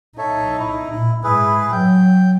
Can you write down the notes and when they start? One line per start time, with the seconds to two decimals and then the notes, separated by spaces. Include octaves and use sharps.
0.18 D#4 A4 C#5 E5
0.59 E4
0.95 A#2
1.24 G#2 E4 G#4 B4
1.72 F#3 G5